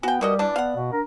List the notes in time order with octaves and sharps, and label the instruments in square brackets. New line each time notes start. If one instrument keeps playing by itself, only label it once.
[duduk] B3 [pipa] F#4 G5 [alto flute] G#5
[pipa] B2 F#4 D#5 [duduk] G3 [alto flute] A#4
[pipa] E3 D4 [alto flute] D5
[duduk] B3 [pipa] F5 F#5
[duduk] B2
[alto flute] D4 [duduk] A#4